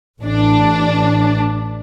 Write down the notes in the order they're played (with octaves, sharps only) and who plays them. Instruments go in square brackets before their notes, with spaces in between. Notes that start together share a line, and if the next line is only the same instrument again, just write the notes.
[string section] A1 D4